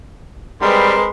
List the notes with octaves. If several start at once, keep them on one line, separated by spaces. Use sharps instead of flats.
G3 G#3 C4 A#4 B4 C6